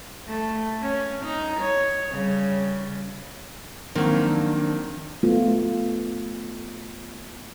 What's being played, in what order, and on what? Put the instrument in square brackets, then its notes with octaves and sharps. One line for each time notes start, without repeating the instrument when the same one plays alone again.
[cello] A3
C#4
D#4
C#5
C#3 G3
[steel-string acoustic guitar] D#3 [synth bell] F3 F#3 G#6 [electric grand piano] A#3 C4 [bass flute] D4
[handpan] A3 B3 F4